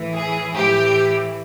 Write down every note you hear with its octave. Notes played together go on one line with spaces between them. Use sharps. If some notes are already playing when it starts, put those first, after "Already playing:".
Already playing: A2 E3
G#4
A2 E3 G4